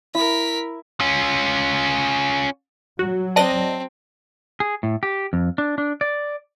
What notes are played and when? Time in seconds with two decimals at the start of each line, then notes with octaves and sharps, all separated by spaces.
0.15 E4 A#4 B6
1.00 C#4 F4
2.99 F#3 F#4
3.36 C4 C5 D5 D#5 A5 A#6
4.60 G#4
4.83 A2
5.03 G4
5.33 F2
5.58 D4
5.78 D4
6.01 D5